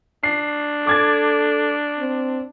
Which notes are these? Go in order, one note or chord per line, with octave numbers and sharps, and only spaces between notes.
D4 C7
A4 D6 G#6 A6
C4